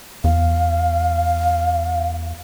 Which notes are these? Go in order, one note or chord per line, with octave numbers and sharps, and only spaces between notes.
E2 F5